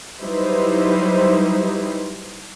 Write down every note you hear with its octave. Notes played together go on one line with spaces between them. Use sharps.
F#3 G3 D#4 E4 B4 C5